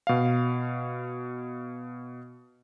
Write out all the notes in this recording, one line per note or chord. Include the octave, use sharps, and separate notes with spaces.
B2 F5